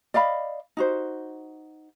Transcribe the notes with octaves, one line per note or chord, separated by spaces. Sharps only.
D5 D#5 F5 B5
D#4 F#4 C5